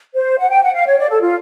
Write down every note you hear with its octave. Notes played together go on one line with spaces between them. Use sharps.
C5
F#5
G5
F#5
F5
C#5
D5
A4
F4